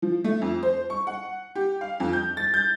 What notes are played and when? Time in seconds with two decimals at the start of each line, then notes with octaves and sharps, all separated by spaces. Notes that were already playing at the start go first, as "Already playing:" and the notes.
0.02 F3
0.24 A3
0.42 F2
0.63 C5
0.90 C#6
1.07 F#5
1.55 G4
1.81 F5
2.00 F2
2.13 G6
2.37 A6
2.54 G6